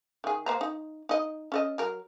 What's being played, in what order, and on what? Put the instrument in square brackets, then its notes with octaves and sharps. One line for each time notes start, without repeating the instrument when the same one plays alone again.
[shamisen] D#3 G#4
A#3 C5 A#5
D#4
D#4 D#5
C#4 A4 D#5
F#3 A#4